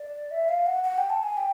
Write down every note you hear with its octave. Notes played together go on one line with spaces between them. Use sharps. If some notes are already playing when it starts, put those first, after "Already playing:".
Already playing: D5
E5
F5
F#5
F#5
G5
A5
G#5
G5